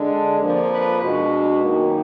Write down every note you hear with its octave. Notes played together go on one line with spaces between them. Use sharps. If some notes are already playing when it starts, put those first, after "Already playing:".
Already playing: D3 G#3 D4
D5
F2 F3 A#3
B4
B2 G#3 D4 F#4
F#2 D#3 A#3 D#4